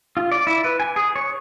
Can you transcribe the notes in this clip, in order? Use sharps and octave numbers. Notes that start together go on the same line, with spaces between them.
F4
D5
E4
B4
G#5
G#4
C#5